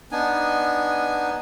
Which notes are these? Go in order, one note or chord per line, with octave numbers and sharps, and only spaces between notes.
B3 D4 D#4 G#5